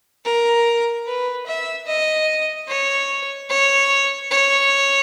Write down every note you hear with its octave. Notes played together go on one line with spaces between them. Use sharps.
A#4
B4
E5
D#5
C#5
C#5
C#5